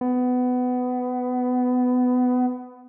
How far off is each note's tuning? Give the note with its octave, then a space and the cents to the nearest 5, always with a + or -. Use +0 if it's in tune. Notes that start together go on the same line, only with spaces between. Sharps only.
B3 +20